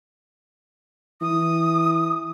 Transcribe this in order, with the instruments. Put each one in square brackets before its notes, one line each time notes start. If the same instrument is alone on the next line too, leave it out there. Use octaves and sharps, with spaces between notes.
[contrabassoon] E3 [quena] D#6